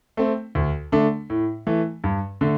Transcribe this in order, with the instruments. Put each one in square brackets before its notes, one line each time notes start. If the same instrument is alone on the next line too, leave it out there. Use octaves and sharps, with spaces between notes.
[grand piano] A3 C4
D2
D3 A3 D4
A2
E3 A3
G2
D3 A3